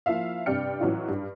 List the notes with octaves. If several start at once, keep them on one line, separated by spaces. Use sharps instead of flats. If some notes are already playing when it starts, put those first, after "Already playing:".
F3 A#3 E4 E5 F5
G2 C3 D5 G5 F6 C#7
A2 E3 F#3 C#4 D#4 F4
G2